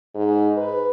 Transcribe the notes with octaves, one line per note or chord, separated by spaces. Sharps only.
G#2
B4